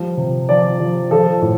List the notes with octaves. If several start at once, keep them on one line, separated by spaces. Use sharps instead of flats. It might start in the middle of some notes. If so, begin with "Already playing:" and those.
Already playing: F3 G3
C3
F3 D5
F3
F3 A4
A2